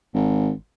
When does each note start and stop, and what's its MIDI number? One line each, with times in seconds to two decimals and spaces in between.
0.14 0.51 32